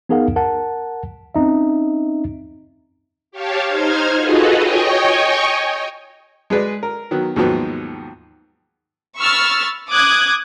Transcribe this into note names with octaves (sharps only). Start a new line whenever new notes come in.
B3 D#4 G#4 A#4 F5 F#5
A#4 F#5 A5
C4 C#4 D#4 E5
G4 C#5 F5 A5
D#4 C5 F6 G#6
F4 F#4 G#4 A4 B4 D#5
C#5 D#5 G5 G#5 C#6
G#3 G#4 B4 D5
A#4
D#3 F#3 B3
D#2 G#2 F3 F#3 B3
B5 C#6 E6 F6 A6
D6 D#6 F#6 G#6